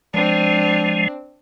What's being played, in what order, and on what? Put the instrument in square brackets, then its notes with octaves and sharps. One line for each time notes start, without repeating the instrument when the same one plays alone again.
[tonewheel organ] F3 G#3 [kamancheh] C4 D4